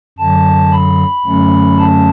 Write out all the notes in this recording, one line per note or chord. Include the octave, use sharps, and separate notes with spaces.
F#2 D3 F#3 A5
B5
F#2 D3 F#3 A3 C#4
A5